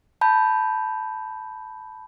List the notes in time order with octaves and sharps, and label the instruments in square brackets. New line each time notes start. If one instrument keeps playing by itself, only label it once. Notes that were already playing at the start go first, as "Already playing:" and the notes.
[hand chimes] A5 B5 G6